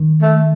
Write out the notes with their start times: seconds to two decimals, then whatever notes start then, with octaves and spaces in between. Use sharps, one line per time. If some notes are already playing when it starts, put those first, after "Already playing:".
Already playing: D#3
0.21 A3